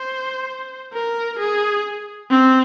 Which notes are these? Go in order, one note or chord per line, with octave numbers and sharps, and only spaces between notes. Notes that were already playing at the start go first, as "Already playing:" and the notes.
Already playing: C5
A#4
G#4
C4